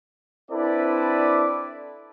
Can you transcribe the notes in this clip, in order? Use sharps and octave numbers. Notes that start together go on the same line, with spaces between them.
C4 D4 E4 A4 B4 D5